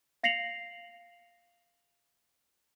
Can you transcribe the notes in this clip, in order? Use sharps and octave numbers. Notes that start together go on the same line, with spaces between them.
F5 A#6 C7 C#7 F7 F#7